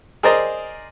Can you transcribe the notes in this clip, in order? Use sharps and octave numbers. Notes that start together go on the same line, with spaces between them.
G#4 A#4 C5 D5 D#5 A#5